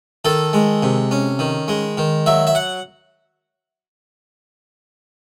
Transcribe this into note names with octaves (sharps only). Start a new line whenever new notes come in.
D#3 A4
G#3
C3
C#4
D#3
G#3
D#3
F#3 E5
E5
F#5